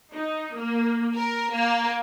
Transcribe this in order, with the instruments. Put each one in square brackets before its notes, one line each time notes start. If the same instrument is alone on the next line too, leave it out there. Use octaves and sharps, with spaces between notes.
[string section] D#4
A#3
A#4
A#3